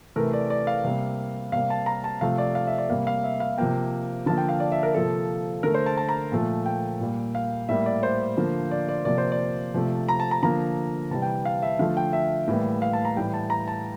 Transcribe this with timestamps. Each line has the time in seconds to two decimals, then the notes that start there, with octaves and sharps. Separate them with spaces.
0.16 C3 E3 A3 A#4
0.33 D5
0.50 D5
0.67 F5
0.84 C3 G3 A#3
1.52 C3 G3 A#3 F5
1.70 A5
1.86 A#5
2.04 A5
2.21 C3 F3 A3 F5
2.38 D5
2.55 F5
2.67 E5
2.78 D5
2.89 C3 G3 A#3 F5
3.07 F5
3.24 E5
3.40 F5
3.58 C3 F3 A#3 G5
4.26 D3 F3 A#3 A5
4.38 G5
4.49 F5
4.60 D5
4.72 E5
4.83 A#4
4.94 C3 F3 A#3 A4
5.63 D3 A3 A#4
5.74 C5
5.86 A5
5.98 A5
6.09 A#5
6.32 A#2 F3 A3
6.66 G5
7.00 A#2 G3 A#3
7.35 F5
7.69 A2 G3 A#3 E5
7.86 D5
8.03 C5
8.37 D3 F3 A#3
8.71 D5
8.89 D5
9.05 C3 F3 A#3 D5
9.18 C5
9.32 D5
9.74 C3 F3 A3
10.09 A#5
10.20 A5
10.31 A#5
10.43 D3 F3 A#3 A#5
11.11 C3 E3 G3 A5
11.22 G5
11.45 F5
11.62 E5
11.79 D3 F3 A3 F5
11.97 G5
12.13 E5
12.48 A2 E3 G3 A#3
12.82 F5
12.93 A5
13.05 A#5
13.16 A2 E3 G3 G5
13.34 A5
13.50 A#5
13.68 A5